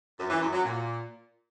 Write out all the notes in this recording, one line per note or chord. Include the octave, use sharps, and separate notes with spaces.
F#2
E3
F#2
F#3
A#2